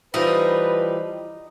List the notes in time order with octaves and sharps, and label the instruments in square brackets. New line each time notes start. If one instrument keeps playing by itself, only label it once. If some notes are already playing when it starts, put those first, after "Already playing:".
[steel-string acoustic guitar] E3 F3 G3 [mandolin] D#4 [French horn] B4